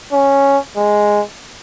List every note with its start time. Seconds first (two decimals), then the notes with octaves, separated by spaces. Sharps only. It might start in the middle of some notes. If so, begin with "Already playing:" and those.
0.12 C#4
0.76 G#3